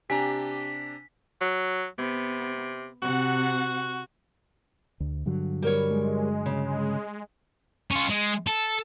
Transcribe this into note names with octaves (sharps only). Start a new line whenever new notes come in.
C3 D4 G4 G#5 A#5 B6
F#3
C3 B3
C3 F#4 F#5
D2
G2 D3 F#3
G3 A#4 C#5
G#3
C#3
C#4 F4
G#3
A4